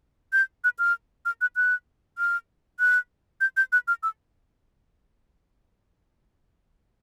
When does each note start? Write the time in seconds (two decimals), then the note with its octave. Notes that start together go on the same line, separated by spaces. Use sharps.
0.33 G6
0.64 F#6
0.79 F6
1.25 F6
1.41 F#6
1.56 F#6
2.18 F6
2.80 F#6
3.41 G6
3.57 G6
3.72 F#6
3.88 F6
4.03 E6